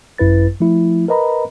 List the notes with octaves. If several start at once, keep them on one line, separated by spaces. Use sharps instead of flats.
G#1 F#2 E4 B4 A6
F3 A3 E4
A#4 B4 D#5 A#5 B5